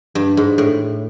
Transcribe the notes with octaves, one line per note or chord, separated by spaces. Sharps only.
G2
G#2
A2